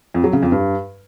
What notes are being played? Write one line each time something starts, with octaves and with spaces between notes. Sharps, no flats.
F2
F#3
C#3
F2
G2